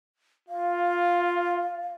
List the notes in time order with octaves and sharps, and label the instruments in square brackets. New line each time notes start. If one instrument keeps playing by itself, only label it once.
[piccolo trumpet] F4 [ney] F5